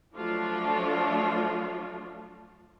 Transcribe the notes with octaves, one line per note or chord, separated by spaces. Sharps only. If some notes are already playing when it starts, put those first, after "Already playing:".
F3 F#3 A3 D4 F4